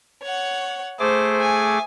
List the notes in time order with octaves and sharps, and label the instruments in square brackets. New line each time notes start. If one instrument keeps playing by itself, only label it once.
[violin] C#5 F#5
[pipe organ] A3 G#4 D6 [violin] C5
[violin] G#5